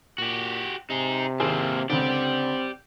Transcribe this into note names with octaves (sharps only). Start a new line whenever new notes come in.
A#2 F#4 G4
C3 D#4 G#4
G#1 A#3 C4 E4 G#4
C#2 D3 C4 G4 D5